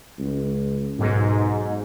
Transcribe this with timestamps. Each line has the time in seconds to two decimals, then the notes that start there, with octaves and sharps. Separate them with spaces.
0.19 C#2
0.99 B1 G#2